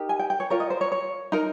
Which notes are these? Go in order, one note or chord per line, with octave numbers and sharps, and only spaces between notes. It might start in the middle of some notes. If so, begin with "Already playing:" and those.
Already playing: D#4 G4 A#4
G#5
G5
G5
C#5
F4 A#4 C#5
D#5
C5
C#5
C#5
D#4 A#4